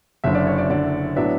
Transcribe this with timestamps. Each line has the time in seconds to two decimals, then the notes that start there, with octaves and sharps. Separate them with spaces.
0.24 F#1 F#2 D3 E5
0.35 D5
0.47 C#5
0.58 D5
0.70 F#1 F#2 D3 D5
1.16 A2 F#3 B3 D4 E5